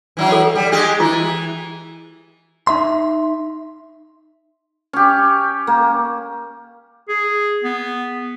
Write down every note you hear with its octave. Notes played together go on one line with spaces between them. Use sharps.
E3 F#3 E4
A4
G3
G#3 G4 G#4
E3 E4
D#4 E5 C6
C#4 G4
A#3
G#4
B3